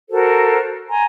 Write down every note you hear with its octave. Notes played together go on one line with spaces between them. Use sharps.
F#4 A4 A#4 C5
G#5 A#5 C6